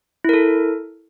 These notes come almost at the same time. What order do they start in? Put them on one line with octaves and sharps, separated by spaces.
E4 A#4 A4